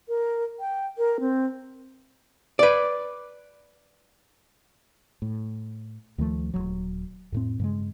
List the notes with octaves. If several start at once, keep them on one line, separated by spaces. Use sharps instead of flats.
A#4
G5
A#4
C4
B4 D5
A2
D2 D#3 F3 A3
D#1 A#1 F#3
F2 A2 C4
G2 C#3 G#3